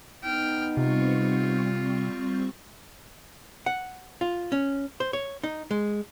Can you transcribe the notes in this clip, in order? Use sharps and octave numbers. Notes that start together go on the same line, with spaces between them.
B3 D#4 G5 F6
C3 G3 C4 F4 C#6
F#5
F4
C#4
C5
C#5
D#4
G#3